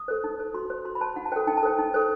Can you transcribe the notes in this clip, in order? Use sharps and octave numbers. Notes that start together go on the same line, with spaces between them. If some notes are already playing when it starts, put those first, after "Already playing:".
Already playing: D#6
A4 C5
D#4
A4 C5
F#4 C6
C5
F#4 C6
B5
C5 A5
D#4 F#5
A5
A4 C5 G5
D#4 G5
A5
A4 C5 G5
D#4
A4 C5